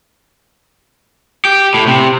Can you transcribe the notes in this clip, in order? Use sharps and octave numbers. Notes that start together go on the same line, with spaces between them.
G4
A2
C3